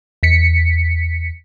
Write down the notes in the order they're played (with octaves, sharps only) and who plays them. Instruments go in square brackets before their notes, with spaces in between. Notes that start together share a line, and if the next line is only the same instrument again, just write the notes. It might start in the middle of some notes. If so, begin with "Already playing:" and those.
[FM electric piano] E2 B6 C#7